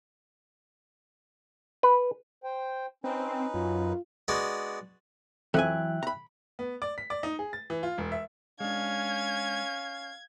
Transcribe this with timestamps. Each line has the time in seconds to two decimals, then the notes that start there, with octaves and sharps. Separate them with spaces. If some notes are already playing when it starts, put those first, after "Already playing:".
1.83 B4
2.44 C5 G5
3.04 C4 C#4 D#4 B4
3.54 F#2 F4
4.28 G#3 B3 D4 F#4
5.54 F2 E3 F#3 E5 G5 G#5 F#6
6.03 A#5 B5
6.59 B3
6.82 D5
6.98 B6
7.10 D5
7.23 D#4
7.39 G#4
7.53 A6
7.70 E3
7.83 F4
7.98 E1
8.12 E5
8.60 G#3 C#4 D4 F5 G#6